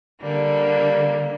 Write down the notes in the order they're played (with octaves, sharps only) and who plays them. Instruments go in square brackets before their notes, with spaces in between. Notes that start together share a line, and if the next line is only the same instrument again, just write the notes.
[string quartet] D3 G3 A#3